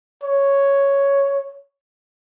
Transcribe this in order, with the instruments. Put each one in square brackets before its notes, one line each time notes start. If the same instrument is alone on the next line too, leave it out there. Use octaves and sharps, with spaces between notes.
[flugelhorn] C#5